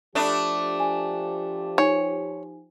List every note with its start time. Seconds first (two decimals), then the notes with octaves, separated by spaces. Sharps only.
0.15 F3 A3 D4 G4 B5 D#6
0.80 G#5
1.78 D#4 C#5 G#5